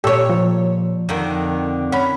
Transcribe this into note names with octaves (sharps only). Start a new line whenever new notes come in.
A#2 G4 A4 C#5 E6
F3
F2 D3 D#3
C#4 F#5 B5